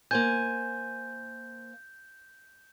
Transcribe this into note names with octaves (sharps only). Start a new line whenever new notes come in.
A#3 C5 G#5 G6